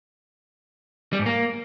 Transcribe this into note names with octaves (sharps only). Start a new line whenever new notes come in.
G3
G#2
A#3